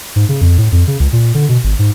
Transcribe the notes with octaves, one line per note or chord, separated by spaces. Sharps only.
G#2
C#3
F2
A2
F2
C#3
C#2
A#2
D3
B2
G#1
G#2